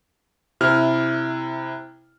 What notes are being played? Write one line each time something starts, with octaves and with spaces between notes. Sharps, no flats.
C3 E4 F6